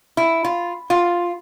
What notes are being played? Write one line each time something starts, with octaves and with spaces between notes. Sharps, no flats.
E4
F4
F4